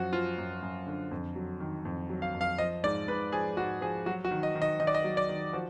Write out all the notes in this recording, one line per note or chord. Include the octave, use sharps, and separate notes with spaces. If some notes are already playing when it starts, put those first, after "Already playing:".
Already playing: F#2 F3 F#4
F3 F4
F#2
F#2
D3
F2
F#3
D#3
F2
F#3
F5
F2
F5
F3 D#5
G#2 D5
G#2 B4
F3 G#4
G#2 F#4
F3 G#4
F#3 F#4
F#4
D#3
D#5
D#3
D#5
D#3 D#5
D5
D#5
F#3
D5
D#3
F3 F#4